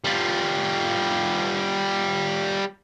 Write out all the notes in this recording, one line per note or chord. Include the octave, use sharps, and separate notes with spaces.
G3 F4